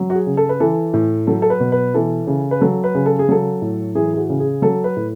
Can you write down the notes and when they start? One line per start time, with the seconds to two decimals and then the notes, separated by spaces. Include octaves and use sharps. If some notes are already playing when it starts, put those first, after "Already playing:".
Already playing: F#3
0.10 F#4
0.15 G#4
0.27 C#3
0.37 A4
0.49 B4
0.60 E3 A4
0.94 A2
1.27 F#3 A4
1.42 A4
1.50 B4
1.60 B2
1.72 B4
1.94 E3 A4
2.27 C#3
2.51 B4
2.61 F#3 A4
2.84 B4
2.95 C#3
3.06 A4
3.19 G#4
3.29 F#3 A4
3.62 A2
3.95 E3 G#4
4.14 G#4
4.17 F#4
4.29 C#3
4.40 G#4
4.62 F#3 A4
4.84 B4
4.97 A2